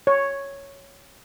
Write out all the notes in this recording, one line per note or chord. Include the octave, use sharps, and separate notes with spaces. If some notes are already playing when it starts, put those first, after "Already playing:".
C#5